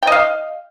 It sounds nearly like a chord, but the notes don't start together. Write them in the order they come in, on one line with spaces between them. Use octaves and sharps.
G5 D#5 F5